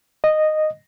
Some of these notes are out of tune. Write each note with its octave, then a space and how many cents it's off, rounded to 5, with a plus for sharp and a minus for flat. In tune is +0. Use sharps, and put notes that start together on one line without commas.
D#5 -10